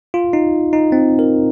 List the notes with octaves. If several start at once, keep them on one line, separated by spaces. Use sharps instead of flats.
F4
D#4
D#4
C4
A#4